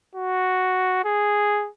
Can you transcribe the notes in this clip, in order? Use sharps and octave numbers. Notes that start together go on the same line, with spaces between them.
F#4
G#4